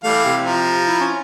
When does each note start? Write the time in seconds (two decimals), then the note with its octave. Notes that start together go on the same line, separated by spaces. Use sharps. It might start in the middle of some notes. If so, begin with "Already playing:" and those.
0.04 E3 G3 A3 F5
0.24 C3
0.43 F3 A#5
0.87 E4
1.00 C#4